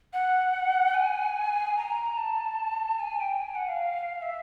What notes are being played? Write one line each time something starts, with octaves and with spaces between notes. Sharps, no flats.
F#5
G#5
A#5
A5
G#5
G5
G#5
F#5
F5
E5